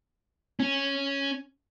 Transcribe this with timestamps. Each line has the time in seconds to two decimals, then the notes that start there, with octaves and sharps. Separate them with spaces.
0.60 C#4